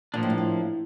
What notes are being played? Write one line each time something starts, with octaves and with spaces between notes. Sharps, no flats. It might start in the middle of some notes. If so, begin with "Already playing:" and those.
A#2 F3 A#3 D4
A2
G2
A2